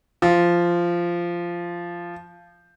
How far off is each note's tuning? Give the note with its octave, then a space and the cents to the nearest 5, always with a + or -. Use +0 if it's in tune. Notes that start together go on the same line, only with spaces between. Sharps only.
F3 -10